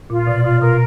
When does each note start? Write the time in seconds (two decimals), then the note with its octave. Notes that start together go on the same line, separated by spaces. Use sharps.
0.10 A#2 F4
0.27 B2 D5
0.44 B2 F4
0.61 B2 A#4